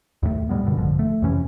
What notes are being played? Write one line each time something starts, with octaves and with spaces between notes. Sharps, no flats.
D#2 A2 G#3 A3
A2 G3 G#3 B3
F#2 B2 D3
A#1 G#2 D3 F3
A3
F2 C3 E3 C#4